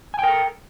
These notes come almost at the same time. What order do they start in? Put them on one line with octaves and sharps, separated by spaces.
G#5 G5 A#4 A4